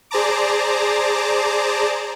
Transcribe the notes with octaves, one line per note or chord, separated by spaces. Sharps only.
G#4 C5 D5 A5 A#5 D6